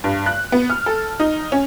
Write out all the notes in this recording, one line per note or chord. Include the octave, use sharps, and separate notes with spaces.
G2
F#6
B3
F6
A4
D#4
C#4